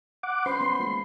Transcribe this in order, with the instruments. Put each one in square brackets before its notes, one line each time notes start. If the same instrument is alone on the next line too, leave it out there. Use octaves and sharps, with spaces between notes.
[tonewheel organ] F#5 D6
[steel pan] C#4 B4 C5 [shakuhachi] B5 [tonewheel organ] C6
[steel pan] B3 C#4 [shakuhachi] B5
[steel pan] G#3 A#3 F4